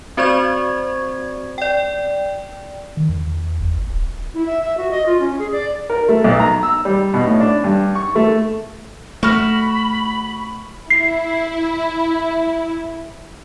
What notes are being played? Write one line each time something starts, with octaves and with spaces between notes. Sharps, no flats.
C4 F#4 C5 D5 C#6 G#6
D5 G5
D#3
E2
F#1
G#1
D1
E4
E5
E5
F#4
D#5
F4
C#4
G#4
D5
A#4
A3
B1
A#5
E6
G3
B2
A2
D4
G2
C#6
A3
A3 F#4 B5 F6
E4 C7